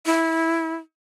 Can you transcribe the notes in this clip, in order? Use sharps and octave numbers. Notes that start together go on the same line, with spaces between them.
E4